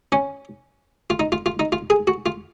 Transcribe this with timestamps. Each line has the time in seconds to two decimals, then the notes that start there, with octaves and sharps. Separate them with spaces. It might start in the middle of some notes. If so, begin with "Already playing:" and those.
0.12 C#4
1.10 F4
1.20 D#4
1.32 F4
1.46 F4
1.59 D#4
1.72 F4
1.90 G#4
2.07 F#4
2.26 F4